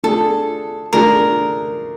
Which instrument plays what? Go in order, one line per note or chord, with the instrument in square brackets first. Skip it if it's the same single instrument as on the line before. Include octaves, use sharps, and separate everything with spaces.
[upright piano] A3 D4 F4 G#4 [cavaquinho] A4
[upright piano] A3 D4 F4 G#4 [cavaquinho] A#4